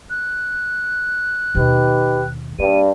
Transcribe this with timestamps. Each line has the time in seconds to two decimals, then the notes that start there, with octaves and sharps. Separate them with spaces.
0.10 F#6
1.55 D#2 B2 D#4 G4 B4
2.59 G2 A#3 D#7